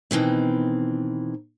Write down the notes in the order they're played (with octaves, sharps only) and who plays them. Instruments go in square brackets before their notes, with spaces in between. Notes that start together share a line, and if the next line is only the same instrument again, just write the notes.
[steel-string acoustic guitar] B2 D#3 E3 C4